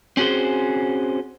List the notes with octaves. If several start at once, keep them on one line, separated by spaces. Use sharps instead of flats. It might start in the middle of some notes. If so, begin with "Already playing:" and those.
C4 C#4 F#4 G#4 C5